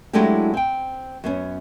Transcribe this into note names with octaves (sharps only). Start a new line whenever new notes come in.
F#3 G#3 A3 D4 E4 G4
C4 G5
F#2 B3 C#4